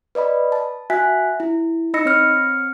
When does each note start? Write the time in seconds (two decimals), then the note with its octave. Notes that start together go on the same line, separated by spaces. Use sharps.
0.15 B4 D5 D#5 B5
0.52 A5
0.90 F#4 E5 G#5 F#6 B6
1.40 E4
1.94 D#4 D#5 B5 E6 A#6 C#7
2.05 C4 C#5 F6 C#7